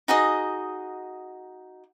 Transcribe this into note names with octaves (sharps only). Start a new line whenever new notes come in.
D#4 F#4 G#4 D#5